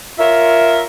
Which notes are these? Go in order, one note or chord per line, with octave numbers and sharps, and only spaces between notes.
F4 A#4 C#5 E5